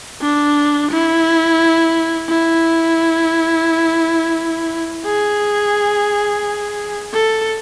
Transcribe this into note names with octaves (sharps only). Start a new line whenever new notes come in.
D4
E4
E4
G#4
A4